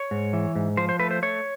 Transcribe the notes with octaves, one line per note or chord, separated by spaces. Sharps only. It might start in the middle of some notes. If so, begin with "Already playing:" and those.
Already playing: C#5
G#2
E3
G#2
F3 C5
C5
A3 B4
C5
A3 C#5